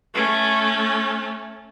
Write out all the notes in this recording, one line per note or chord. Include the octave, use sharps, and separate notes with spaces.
A3 C#4